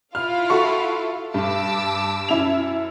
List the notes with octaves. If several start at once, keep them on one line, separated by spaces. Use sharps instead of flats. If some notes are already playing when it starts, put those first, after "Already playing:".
E4 F4 F5 F6
F#4 A4 C#6
G2 A5 D6 E6
F#2 E4 F7